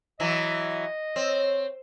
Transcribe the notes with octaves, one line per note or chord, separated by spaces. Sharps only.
E3 F#3 D#5
C4 C#5